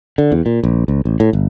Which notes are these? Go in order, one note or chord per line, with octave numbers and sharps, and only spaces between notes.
D3
E2
A#2
A#1
C#2
A1
A2
G1